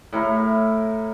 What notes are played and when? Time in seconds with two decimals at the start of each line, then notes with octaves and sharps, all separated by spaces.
0.13 A2 E4 A#4 C#6